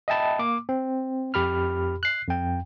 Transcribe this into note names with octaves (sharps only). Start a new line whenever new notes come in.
D#5 E5 G5 A5 B5
A#3 D6
C4
F2 G4 B5 F6
F#6 C7
F2 G5